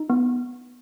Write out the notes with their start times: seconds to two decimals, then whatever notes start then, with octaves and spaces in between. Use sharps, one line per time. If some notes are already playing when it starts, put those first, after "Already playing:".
Already playing: D#4
0.10 B3